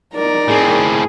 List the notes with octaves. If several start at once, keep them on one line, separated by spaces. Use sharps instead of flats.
D#4 A#4 D5
A2 C4 G#4